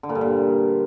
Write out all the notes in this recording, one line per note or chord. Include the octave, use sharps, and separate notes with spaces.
D3
A#2
G2
A#2